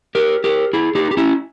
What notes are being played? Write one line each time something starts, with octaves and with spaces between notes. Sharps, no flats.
G4 A#4
G4 A#4
E4 G#4
D#4 G4
G4
C#4 E4